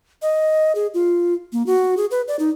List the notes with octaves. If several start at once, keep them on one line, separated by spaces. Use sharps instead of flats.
D#5
G#4
F4
A#3
F#4
G#4
B4
D5
D#4